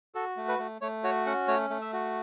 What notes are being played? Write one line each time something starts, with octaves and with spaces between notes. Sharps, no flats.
F#4 A4
A3
B4
A3
A3 C#5
F#4 C#5
C#4 F#5
A3 C#5
A3
E5
F#4